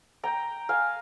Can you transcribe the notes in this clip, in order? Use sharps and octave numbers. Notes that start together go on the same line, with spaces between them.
G5 A#5
F5 G#5